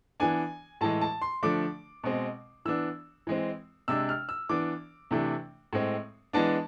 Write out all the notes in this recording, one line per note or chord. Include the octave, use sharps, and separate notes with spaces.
E3 B3 D4 G#5
A2 E3 G#3 A5
A5
C6
D3 F3 A3 D4 D6
B2 G#3 C4
E3 B3 D4 E6
E3 G#3 C4
C3 G#3 D4 E6
F6
E6
E3 B3 D4 D6
C3 E3 A3 D4
A2 G#3 C4
E3 G#3 B3 D4 A5